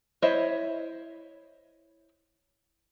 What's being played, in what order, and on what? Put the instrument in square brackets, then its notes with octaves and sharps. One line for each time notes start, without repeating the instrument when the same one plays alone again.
[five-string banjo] E4 C5 C#5 D#5 E5